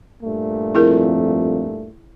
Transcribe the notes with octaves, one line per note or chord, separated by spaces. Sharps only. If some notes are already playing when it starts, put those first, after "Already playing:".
G2 A#2 A3
F2 E4 G#4 A#4